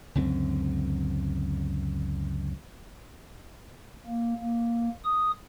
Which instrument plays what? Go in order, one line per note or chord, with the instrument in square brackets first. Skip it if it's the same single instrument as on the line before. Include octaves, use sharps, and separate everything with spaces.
[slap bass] C#2 F#2 D3 C4
[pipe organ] A#3
A#3
D#6